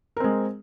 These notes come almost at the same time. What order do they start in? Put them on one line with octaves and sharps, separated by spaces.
A#4 C4 G#3